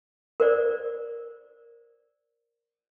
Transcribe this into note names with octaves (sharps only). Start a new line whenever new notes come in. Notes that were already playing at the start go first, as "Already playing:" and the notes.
A#4 C5 D5